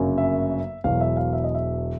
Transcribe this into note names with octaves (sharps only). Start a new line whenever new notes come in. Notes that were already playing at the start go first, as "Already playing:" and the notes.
Already playing: G1 F#2 C#3 F#3 A#3
E5
E1 E2 B2 F#3 F5
E5
F5
E5
D#5
E5